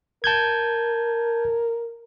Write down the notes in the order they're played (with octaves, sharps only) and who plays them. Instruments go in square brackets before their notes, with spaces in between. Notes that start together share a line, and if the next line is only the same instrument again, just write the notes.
[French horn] A#4 [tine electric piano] A5 G6 G#6